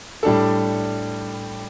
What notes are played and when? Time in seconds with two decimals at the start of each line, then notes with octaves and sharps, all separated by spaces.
0.23 A2 G3 D4 A4